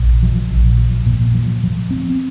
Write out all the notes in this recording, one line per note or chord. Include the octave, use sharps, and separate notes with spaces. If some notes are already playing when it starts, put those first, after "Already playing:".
Already playing: A#1
F3
A#1
F3
A#2
F3
F3
C4